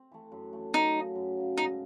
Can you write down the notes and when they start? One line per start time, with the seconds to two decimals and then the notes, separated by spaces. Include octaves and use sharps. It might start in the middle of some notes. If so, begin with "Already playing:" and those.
Already playing: C4
0.12 E3 A3
0.32 F#2
0.53 E3 A3
0.74 F#2 D#4
0.95 C#3 F#3
1.15 F#2
1.37 C#3 F#3
1.57 G#2 D#4